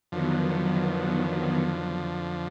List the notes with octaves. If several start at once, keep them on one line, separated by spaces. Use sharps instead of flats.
F2 D3 D#3 F3 F#3 B3